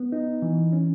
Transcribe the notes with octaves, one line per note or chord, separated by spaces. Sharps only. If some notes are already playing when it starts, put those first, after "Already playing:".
Already playing: B3
D#4
E3
C#4